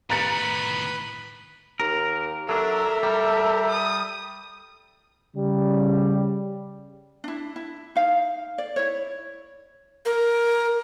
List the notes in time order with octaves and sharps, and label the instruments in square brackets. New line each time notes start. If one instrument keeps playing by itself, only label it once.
[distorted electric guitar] A2 D#3 [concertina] B4 B5 [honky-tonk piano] A#5 A6 C#7
[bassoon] D#2 [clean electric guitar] A#4
[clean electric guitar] F#3 D4 [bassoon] A4 [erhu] A#4 [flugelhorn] E5
[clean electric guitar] G3 [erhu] A#4
[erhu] D#6
[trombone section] C#3 G3
[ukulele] D4 E4
E4
D#4 F5
D5
E4 C#5
[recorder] A#4